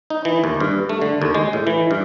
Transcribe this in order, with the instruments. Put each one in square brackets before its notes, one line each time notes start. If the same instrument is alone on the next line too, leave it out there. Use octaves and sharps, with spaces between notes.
[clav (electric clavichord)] D#4
E3
D#2
G2
A3
D3
D#2
G#3
A2
E3
G2